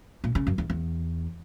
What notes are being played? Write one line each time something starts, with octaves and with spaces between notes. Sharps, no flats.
A#2
C#3
F#2
E2
E2